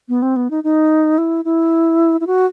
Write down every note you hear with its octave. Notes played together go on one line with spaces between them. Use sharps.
B3
C4
B3
D#4
D#4
E4
E4
E4
F#4